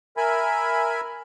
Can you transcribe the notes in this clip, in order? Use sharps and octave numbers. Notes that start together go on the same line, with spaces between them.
A#4 E5 G#5 B5